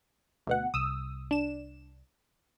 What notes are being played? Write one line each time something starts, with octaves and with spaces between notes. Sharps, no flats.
D2 B2 F#5
C2 D#6 E6
D4 E7